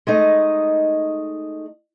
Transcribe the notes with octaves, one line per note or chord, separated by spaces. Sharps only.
G#3 A3 D#4 D#5